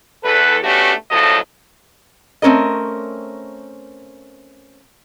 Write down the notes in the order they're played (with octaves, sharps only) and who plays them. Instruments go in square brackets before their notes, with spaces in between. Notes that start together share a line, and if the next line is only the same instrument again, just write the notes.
[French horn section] E2 A4 B4
A3 B3 C#4 D4 F#4 G4
A2 C#3 F3 F#3 A4 D#5
[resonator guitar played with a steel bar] A3 C4 C#4 A#4 D#5